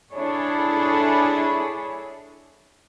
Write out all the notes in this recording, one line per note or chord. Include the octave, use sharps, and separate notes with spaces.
D4 E4 G#4 A4 C#5